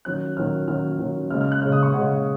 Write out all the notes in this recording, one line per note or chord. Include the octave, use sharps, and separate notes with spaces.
D#3 F#3 C#4 F#6
D#3 F#3 C#4 F6
D#3 F#3 C#4 F6
D#3 F#3 C#4
C#3 G#3 C#4 F6
F6
F#6
C#3 G#3 C#4 F6
D#6
C#6
C#3 G#3 C#4 F#5